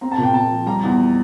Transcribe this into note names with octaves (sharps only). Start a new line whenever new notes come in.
C4 A#5
A5
A#2
G5
A#2 A5
F3
G3 A#5
E2